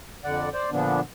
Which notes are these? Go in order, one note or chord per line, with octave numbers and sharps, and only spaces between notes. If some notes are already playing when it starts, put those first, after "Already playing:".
F2 D3 D5 F#5
C5 D5
A#2 D3 F3 B3 D4